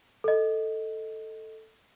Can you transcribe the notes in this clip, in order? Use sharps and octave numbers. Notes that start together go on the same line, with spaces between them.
A4 D#5